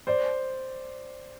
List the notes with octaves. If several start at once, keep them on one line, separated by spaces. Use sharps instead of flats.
C5 D5